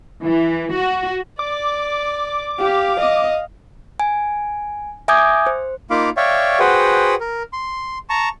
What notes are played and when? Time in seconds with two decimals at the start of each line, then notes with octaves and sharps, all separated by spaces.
0.24 E3
0.73 F#4
1.39 D5 D6
2.59 G4 F5
3.00 D#5
4.00 G#5
5.08 E5 G#5 D6 D#6 G6 G#6
5.47 C5
5.90 A#3 D#4 F4 F5 B5 D6
6.17 C#5 D5 E5 F5 G5 C#6
6.59 F#4 G#4 B4 C5 F#5 G5
7.20 A#4
7.53 C6
8.10 A5 A#5 C#6